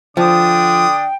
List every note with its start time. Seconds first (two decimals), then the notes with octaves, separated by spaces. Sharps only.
0.17 D3 F3 D4 G5 D#6